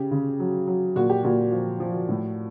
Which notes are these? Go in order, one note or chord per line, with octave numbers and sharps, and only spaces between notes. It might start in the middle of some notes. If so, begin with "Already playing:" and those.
Already playing: C#3 G4
C#3
F#3
F#3
A#2 F#4
G4
A#2 F#4
F3
F3
A2